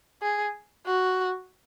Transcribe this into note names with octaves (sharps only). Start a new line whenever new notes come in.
G#4
F#4